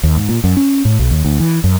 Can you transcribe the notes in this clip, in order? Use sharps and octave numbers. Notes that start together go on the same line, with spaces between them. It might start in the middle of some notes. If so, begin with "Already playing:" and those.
D#2
G#2
A#2
F#2
C#4
A2
B1
D#2
D2
E3
F#2